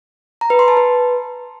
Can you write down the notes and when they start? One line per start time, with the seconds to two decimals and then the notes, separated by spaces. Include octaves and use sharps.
0.41 A#5
0.50 B4
0.59 C6
0.68 A5
0.77 B4